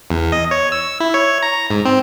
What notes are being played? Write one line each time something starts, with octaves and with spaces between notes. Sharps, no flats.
E2
D#5
C#5
E6
E4
C#5
A#5
G#2
C4